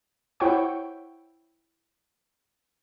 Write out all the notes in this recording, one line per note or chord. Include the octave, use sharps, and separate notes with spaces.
E4 C5 C#5 F#5 G5 C#6